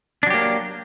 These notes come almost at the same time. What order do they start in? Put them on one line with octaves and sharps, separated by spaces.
D4 F#3 G4 A#3